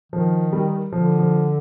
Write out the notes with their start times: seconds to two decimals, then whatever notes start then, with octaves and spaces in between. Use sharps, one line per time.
0.12 D#3 F3
0.53 G3
0.92 D3 F3
1.19 F3